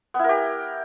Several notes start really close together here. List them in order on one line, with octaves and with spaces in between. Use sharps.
B3 E4 A#4 G4